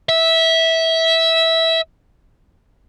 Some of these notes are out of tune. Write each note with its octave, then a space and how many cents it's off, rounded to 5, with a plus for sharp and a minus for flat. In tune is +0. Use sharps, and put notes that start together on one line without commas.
E5 -15